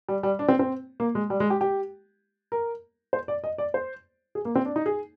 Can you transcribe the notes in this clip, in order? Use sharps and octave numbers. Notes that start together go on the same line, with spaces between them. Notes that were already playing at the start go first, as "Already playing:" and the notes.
G3
G3
D4
C4
C4
A#3
G#3
G3
G#3
G4
G4
A#4
C5
D5
D#5
D5
C5
G#4
A#3
C4
D4
D#4
G#4